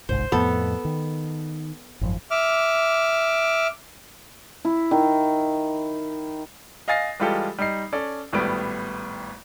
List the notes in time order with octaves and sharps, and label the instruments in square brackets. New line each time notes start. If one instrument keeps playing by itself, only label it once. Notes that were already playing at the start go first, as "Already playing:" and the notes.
[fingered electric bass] G1 C2 G#2 [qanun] C5
[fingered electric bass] F2 A2 [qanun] B3 A4
[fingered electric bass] D#3
G#1 F#2 F3
[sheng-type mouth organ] E5 D6 F6
[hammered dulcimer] E4
D#3
[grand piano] D#5 F5 G#5 A6 A#6 C7
E3 G3 G#3 F4 G4 A4
G3 D#4 C7
C#4 A4 D5
G#1 A2 G3 B3 D7